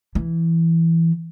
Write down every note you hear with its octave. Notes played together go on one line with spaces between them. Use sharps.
E3